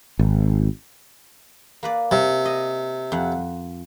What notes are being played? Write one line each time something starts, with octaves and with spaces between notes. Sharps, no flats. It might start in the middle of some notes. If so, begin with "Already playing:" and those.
G#1
A#3 B4 D5
C3
D#5
F2 F#5